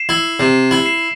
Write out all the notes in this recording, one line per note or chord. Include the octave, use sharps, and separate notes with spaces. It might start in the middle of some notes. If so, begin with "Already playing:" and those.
Already playing: C7 E7
E4
C3 C7 E7
E4
C7 E7